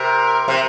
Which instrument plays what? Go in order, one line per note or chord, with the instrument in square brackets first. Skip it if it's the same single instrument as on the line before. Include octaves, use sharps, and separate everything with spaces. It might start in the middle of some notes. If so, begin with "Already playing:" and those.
Already playing: [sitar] C3 [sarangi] A#4
[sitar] C3